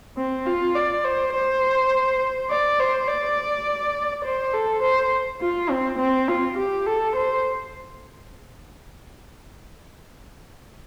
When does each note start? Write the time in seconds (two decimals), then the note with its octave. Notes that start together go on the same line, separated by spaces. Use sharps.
0.17 C4
0.46 F4
0.76 D5
1.04 C5
1.33 C5
2.50 D5
2.79 C5
3.09 D5
4.25 C5
4.54 A4
4.82 C5
5.41 F4
5.70 C4
5.99 C4
6.29 F4
6.58 G4
6.86 A4
7.16 C5